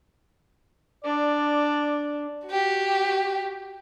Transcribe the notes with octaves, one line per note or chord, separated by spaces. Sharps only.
D4 D5
F#4 G4